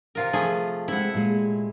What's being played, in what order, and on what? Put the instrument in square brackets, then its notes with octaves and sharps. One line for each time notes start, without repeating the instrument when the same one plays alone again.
[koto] C3 F4 A#4
F3 A3 G#4
[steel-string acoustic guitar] G#3 C4 [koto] E4 F#5
[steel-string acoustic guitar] A#2 G#3